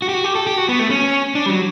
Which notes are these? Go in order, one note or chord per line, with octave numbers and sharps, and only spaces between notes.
F#4
G4
F#4
G4
A4
G4
F#4
B3
A3
C#4
D4
G3
F#3